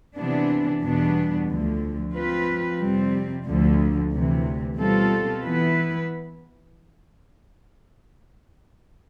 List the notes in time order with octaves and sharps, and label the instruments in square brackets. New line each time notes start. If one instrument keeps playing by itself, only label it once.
[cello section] C3 E3 B3 D4
E2 B2 G3 B3 D4
D2 D3 F3
F3 C4 F4 B4
F2 C3 G3 C4
D2 D3 F3
D2 C3 E3
B2 G3 C4 F4 A4
E3 B3 E4 B4